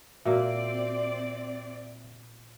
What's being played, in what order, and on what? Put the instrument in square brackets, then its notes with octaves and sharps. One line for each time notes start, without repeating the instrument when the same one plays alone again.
[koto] A#2 A#3 [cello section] C4 D5 [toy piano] F#4 A#4 [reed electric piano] E5